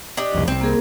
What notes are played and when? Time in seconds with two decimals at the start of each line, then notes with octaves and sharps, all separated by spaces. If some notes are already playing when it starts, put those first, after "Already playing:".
0.17 D4 G4 D#5
0.34 C2 F2
0.48 C2 C4
0.61 A#3 G#4 A#4